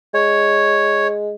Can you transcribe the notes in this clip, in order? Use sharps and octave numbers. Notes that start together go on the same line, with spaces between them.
G#3 C#5